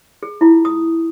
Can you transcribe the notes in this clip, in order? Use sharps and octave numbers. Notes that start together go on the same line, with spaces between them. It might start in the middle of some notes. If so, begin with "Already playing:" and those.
G#4
E4 F4
D#6